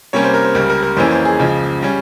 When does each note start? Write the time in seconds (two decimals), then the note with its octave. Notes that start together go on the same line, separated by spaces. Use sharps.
0.13 C3 G3 A#3 C#4 C#5
0.24 C5
0.34 A#4
0.45 C5
0.55 C#2 C#3 G3 A#4
0.69 A#4
0.83 A#4
0.97 F2 E3 A#3 C#4 C5
1.11 C5
1.25 G#4
1.40 C#2 C#3 F3
1.82 G3 C#4